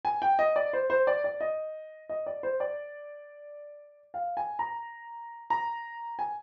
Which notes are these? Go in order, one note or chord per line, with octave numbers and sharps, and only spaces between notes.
G#5
G5
D#5
D5
C5
C5
D5
D5
D#5
D#5
D5
C5
D5
F5
G#5
A#5
A#5
G#5